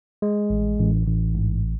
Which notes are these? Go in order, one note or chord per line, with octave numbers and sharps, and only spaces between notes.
G#3
A1
A1
A1
G#2